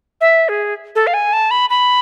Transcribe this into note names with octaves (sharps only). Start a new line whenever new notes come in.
E5
G#4
A4
F5
G#5
A5
B5
B5